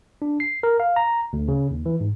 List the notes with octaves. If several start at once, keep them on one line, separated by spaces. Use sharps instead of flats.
D4
C7
A#4
F5
A#5
D2
C#3
D#2
E3
G#2